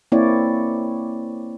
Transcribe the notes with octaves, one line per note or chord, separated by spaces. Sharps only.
A#3 C4 E4 C#5 D5